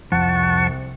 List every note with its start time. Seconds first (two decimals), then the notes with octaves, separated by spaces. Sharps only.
0.12 C2 F2 F#5 A5 C#6